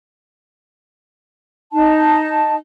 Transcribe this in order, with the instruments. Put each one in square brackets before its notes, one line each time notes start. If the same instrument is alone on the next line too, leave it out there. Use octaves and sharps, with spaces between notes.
[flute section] D#4 A5